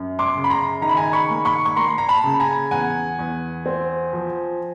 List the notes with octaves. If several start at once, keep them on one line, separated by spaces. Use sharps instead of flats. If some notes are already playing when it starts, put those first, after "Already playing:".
Already playing: F#2
C6 D6
C#3
B5
A#5 C6
D#3 A#5
B5
G#5 A#5
B5 C#6
A#3
B5 C#6
C#6
A#3 A#5 C6
A#5
A5 B5
C#3
G#5 A#5
E2 F#5 G#5
E2
C4
F3